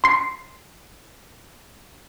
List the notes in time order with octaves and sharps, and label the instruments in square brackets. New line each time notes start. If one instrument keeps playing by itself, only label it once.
[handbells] C6 C7